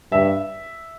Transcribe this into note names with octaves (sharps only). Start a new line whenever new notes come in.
G2 E5